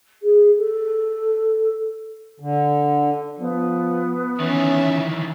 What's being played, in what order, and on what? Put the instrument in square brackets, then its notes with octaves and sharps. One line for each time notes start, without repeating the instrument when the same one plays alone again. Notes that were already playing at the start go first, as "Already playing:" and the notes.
[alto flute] G#4
A4
[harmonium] D3
[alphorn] F3 [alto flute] B3
[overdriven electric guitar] D#3 E3 [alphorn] C#4 [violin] E5